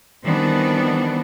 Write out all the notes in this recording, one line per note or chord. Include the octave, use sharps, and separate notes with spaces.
D#3 E3 G3 B3 C4 D4